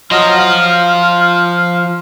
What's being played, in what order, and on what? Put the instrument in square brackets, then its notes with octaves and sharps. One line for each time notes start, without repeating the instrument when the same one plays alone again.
[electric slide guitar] F3 F4 [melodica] F#3 D#5 [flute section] F6
[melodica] F5